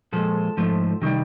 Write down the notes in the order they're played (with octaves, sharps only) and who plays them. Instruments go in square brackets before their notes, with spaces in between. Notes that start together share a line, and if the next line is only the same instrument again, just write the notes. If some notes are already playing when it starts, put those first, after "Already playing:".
[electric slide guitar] A#2 F3 G#3 A4
G#2 F3 A3
C3 D#3 G3